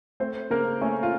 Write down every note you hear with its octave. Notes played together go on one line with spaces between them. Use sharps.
A3 C4 C5
C#3 A#3 A#4
A3 C#4
F4